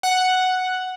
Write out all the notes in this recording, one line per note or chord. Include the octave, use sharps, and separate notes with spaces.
F#5